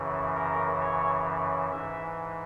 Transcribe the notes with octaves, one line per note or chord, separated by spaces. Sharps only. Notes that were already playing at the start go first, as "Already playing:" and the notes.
Already playing: F#2 C#3 E3
A#4
C#5
G#2 E3 E5